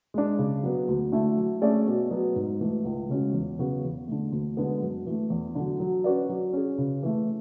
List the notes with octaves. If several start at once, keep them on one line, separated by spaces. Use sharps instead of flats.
G#3 D4
C#3
F#3 B3
D2
D3 A3 E4
F#3
A3 C#4 G#4 D5
B2
F#3 B3
G#2
E3 A3
C#2
C#3 G#3 C#4 F#4
E2
C#3 F#3 B3 F#4
E2
D3 A3
D2
D3 G#3 B3
F#2
E3 A3
E2
D3 F#3
F#3
C#4 F#4 B4 D5
F#3
C#4 G#4
C#3
E3 A3